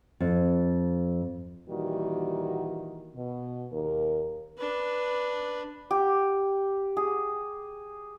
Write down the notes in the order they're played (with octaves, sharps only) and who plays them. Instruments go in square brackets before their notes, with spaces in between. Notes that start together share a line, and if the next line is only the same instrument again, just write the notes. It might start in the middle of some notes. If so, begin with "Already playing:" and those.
[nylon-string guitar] F2
[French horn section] A#2 D#3 E3 G3 F#4
B2
D#2 A#4
[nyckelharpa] D4 B4
[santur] G4
G#4